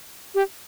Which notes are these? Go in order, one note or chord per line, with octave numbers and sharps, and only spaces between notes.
G4